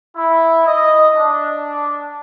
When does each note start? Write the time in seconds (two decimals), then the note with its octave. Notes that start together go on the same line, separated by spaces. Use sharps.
0.17 E4
0.66 D#5
1.15 D4